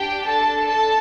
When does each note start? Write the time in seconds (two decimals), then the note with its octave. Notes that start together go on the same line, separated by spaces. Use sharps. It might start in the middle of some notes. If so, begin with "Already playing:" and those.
Already playing: D4 G4 G5
0.26 A4 A5
0.67 A4 A5